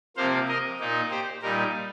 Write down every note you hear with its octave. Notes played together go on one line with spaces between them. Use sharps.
C3 F3 A#3 C5 F5
A#4 D#5
A#2 A#3 D#4
G4 C5
A#2 G3 D#4 A#4